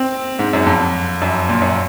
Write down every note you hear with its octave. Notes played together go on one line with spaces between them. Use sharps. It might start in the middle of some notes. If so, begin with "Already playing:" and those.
Already playing: C4
G#2
F#2
F2
F#2
A#2
F#2